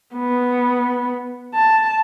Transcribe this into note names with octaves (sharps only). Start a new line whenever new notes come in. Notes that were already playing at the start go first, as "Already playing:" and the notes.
B3
A5